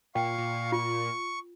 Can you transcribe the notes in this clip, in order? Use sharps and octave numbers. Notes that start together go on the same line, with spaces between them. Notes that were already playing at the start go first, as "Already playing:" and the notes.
A#2 F5 G5 C#6
A#2
F4 C#6